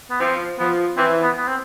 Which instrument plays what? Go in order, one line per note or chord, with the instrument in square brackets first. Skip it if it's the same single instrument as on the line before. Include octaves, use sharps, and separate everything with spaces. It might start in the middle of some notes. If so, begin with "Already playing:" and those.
[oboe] B3
[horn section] F3 [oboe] C4
[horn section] F3 [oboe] B3
[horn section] E3 [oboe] C4
[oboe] B3
B3
C4